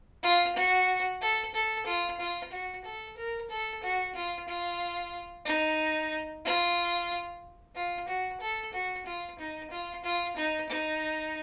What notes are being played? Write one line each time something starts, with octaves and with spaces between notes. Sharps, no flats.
F4
F#4
A4
A4
F4
F4
F#4
A4
A#4
A4
F#4
F4
F4
D#4
F4
F4
F#4
A4
F#4
F4
D#4
F4
F4
D#4
D#4